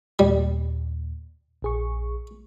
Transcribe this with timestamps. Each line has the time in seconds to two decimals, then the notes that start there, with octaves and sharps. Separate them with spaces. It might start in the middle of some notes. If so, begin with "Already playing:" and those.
0.19 D#2 A#2 G3
1.62 A#1 G#4 C#6